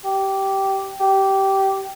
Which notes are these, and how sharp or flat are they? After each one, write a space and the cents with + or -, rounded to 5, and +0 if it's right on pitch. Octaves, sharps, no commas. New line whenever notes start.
G4 -15
G4 -15